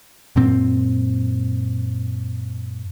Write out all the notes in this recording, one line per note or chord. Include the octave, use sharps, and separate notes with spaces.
F#2 A#2 C4